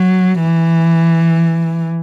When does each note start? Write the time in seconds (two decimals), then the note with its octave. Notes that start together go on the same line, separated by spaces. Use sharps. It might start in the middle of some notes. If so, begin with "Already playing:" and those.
Already playing: F#3
0.41 E3